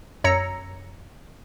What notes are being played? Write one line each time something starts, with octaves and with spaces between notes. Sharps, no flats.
F#2 C#5 A#5 E6 A#6 C#7